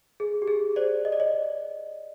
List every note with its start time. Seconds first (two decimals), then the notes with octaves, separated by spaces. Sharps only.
0.20 G#4
0.42 G4
0.47 G#4
0.76 C5 D5
1.05 D#5
1.12 D5
1.20 C#5 D#5